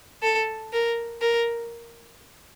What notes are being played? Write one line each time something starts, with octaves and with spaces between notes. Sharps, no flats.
A4
A#4
A#4